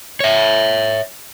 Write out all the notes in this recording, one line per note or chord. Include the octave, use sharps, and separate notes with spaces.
C#5 E5